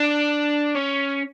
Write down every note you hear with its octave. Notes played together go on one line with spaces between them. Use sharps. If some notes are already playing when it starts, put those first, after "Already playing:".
Already playing: D4
C#4